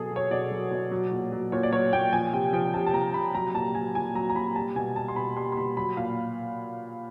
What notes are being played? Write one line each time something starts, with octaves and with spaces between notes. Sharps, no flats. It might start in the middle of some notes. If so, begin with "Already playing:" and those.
Already playing: B2 F#3 G#4 A4
F#3
C#5
B2 D5
F#3
B2
F#3
A#2
F#3
A#2 C#5
D5
F#3 C#5
A#2 G5
F3 G#5
C3 G5
F3 G5
C3 A5
A5
F3 A#5
C3 B5
F#3 A#5
A#2 A5
F#3 G#5
A#2 G#5
F#3 A#5
A#5
A#2 B5
G3 A5
B2 G#5
G3 A5
C6
B2 B5
G3 C6
C6
B2 B5
F#3 B5
A#2 F5